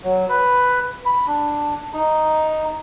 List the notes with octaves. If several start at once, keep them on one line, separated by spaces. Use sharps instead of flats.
F#3
B4
B5
D4
D#4